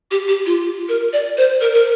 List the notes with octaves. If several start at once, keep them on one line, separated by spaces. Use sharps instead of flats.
G4
G4
F4
A#4
D5
C5
A#4
A#4